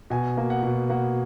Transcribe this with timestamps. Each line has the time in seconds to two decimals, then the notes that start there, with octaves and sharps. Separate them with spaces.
0.10 B2 G#5
0.37 A#3
0.50 F#5
0.63 B2
0.90 A#3 F#5